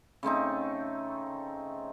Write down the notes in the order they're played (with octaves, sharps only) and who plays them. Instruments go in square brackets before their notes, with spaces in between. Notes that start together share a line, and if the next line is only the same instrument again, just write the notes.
[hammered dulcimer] C#3 A3 C4 D#4